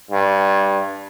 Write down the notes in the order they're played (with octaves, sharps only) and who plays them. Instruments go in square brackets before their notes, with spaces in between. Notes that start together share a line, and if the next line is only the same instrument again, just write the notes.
[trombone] G2